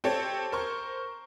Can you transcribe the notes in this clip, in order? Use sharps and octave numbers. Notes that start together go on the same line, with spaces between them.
C4 G4 A4 C#5
A#4 C5 C#6